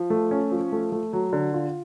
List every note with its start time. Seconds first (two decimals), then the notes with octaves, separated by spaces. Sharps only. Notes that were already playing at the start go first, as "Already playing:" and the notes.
Already playing: F3
0.10 A3
0.31 C#4
0.51 F3
0.72 A3
0.92 A3
1.13 F#3
1.33 D3
1.54 F4